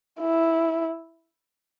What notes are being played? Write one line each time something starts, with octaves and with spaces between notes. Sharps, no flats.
E4